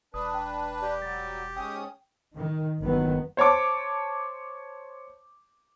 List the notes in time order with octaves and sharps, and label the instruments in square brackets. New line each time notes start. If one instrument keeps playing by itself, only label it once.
[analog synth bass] E1 [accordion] D4 B4 [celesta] D#6
[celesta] G5
[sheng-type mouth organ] G4 [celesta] D5
[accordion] F#3 G3 [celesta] A6
[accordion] G#2 C#4 D#6 [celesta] G5
[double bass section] D#3
G1 D#3 F#3 B3
[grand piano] C5 C#5 A5 D6